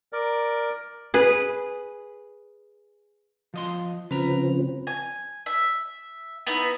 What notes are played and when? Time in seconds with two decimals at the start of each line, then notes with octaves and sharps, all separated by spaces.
0.13 A#4 D5
1.14 G#4 B4
3.54 F3 D#5 C6
4.11 C#3 F3 C4 B4 A#5
4.87 G#5
5.46 E5
6.47 B3 D#4 E4